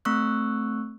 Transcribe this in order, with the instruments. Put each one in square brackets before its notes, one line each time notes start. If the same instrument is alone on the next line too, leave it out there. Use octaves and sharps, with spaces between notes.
[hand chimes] A3 C4 C#6 E6 F#6